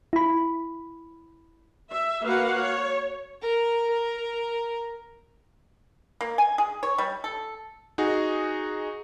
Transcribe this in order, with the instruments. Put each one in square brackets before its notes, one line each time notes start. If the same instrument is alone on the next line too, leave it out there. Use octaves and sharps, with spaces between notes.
[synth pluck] E4 B5
[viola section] E5
A#3 F#4 B4 F5 F#5
C#5
[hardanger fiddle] A#4
A#4
[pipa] A#3
G#5
G#4
C#5
G3
A4
[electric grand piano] D#4 F#4 G#4